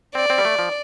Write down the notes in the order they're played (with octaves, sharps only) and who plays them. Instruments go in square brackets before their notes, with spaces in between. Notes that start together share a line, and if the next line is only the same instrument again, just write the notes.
[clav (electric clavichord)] C4 [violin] D5
[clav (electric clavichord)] C4
G3
A3
F3